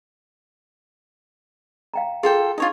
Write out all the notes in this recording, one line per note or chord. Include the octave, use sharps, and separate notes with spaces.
F5 G5 A#5
F4 G#4 A4 G5
D4 D#4 F4 C#5 D#5